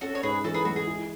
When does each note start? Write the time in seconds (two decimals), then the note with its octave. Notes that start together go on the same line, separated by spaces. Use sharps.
0.01 C#4 F#4 A4
0.15 C#5
0.23 G#2 G#4 B4
0.44 E3 F#4 A4
0.54 G#4 B4
0.65 G#3 F#4
0.76 G#4
0.87 E4